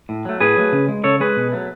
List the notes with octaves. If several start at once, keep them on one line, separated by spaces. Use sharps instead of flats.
A2
F#3 A3
A2 G#4 B4
F#3 A3
C#3
G#3
C#3 A4 C#5
G#3 G#4 B4
B2
F#3 A3